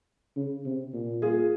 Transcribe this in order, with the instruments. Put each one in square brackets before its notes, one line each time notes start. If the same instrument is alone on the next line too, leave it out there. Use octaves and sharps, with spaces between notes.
[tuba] C#3
C3
A#2
[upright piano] F4 G#4